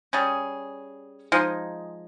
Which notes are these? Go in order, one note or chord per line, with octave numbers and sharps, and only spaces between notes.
G3 C#4 G#4
F3 G#3 D#4